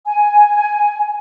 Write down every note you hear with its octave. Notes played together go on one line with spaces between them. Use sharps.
G#5